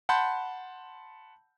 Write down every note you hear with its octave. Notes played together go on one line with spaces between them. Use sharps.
F#5 A5 B5 C6 G6